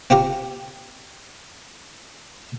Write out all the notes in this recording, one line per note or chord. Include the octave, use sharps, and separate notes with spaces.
C4 F4 G4 A#4